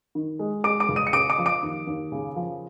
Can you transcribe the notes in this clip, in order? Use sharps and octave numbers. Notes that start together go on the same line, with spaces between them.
D#3
G#3
G#3 D6 D7
D6 D7
C#2
D#6 D#7
C#7
C#3 D6 D7
D6 D7
F3
D6 D7
D#2
D#2
C#3
F3